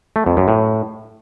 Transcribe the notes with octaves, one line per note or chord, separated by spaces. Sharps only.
A3
F2
F#2
A2